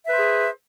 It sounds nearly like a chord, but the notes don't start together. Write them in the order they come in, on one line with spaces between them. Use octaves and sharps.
E5 B4 C5 G#4